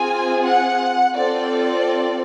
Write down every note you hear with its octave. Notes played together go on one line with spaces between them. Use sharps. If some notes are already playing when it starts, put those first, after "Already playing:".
Already playing: C4 F4 G#4 G#5
F#5
C4 F4 A4 D5